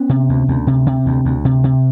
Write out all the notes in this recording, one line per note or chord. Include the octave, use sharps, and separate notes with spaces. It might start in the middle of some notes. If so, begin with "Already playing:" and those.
Already playing: B3 C#4
C3
D2
D2
C3
C3
D2
D2
C3
C3